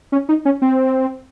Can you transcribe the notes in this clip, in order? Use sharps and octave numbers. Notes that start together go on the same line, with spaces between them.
C#4
D#4
C#4
C4